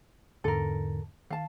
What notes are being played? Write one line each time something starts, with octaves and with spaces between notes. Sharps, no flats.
E2 G#2 D3 A4 A#4
D#3 F5 A5